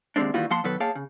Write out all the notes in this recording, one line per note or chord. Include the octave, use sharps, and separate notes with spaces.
D#2 C3 E3 G#3 C4 D4
D#3 E3 G3 A#3 F4 F#4
F3 A#3 F#5 A5 C6
B2 D#3 F#3 A4 B4
A#3 G#4 C#5 F5 G5 A5
C#3